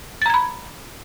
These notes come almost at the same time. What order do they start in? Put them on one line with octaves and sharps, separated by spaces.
A6 A#5 G#6 B5